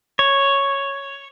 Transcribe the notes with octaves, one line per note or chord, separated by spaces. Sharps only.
C#5